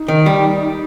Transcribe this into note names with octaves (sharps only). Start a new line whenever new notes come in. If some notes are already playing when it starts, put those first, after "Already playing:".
Already playing: D#4
D#3
G3